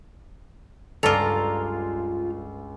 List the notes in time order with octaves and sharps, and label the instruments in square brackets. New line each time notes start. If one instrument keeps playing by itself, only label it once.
[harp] C#2 G2 E6 [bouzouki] F4 A#5 [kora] A4 D5